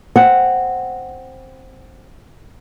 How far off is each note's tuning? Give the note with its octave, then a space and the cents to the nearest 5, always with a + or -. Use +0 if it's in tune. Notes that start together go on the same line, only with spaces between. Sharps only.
C4 +5 F#5 +0